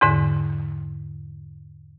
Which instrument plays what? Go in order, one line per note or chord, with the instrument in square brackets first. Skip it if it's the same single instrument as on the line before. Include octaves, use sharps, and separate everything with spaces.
[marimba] E2 G#2 D3